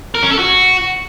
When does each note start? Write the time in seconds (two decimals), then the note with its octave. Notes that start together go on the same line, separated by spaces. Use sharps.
0.15 A#4
0.23 C#4
0.31 A4
0.39 F#4